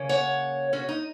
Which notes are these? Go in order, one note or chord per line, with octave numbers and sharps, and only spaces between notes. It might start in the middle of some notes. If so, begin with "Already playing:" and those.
Already playing: C#3 A#3 C#4
C#5 F#5
C#4 F#4
D#4